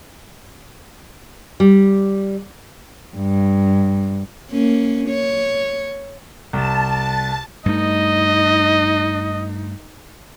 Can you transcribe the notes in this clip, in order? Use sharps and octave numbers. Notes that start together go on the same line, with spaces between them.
G3
G2
A#3 C#4
C#5
C2 A5
G2 A3 D#4 D#5